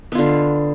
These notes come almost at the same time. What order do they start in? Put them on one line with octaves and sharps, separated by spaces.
B3 F4 D3